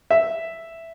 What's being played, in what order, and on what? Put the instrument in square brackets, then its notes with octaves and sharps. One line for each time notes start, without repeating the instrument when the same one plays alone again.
[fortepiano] E5